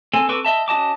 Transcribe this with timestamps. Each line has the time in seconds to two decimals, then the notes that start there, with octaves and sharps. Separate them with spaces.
0.13 C4 A4 G#5
0.29 C4 A4 B4 C#6 D6
0.45 D#5 E5 A5
0.68 C#4 F#4 D#5 A5 D6